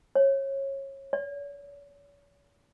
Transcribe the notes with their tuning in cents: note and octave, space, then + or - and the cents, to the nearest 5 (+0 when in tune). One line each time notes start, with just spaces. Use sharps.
C#5 -25
C#5 +45